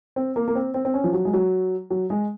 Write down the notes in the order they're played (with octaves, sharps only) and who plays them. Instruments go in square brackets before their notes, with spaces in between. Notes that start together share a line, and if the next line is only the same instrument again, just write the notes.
[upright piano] C4
A#3
A#3
C4
C4
C4
C#4
F3
F#3
G#3
F#3
F#3
G#3